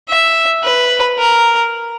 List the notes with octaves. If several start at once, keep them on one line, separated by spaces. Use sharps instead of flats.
E5
B4
A#4